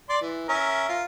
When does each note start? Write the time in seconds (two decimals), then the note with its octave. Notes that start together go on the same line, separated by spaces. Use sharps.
0.09 D5 C6
0.21 E3
0.49 C#4 A#4 E5
0.89 F4